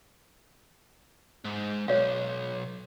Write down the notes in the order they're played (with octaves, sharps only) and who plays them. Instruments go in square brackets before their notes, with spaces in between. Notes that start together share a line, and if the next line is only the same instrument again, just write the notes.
[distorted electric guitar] G#2
[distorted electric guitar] B1 [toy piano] C#5 F5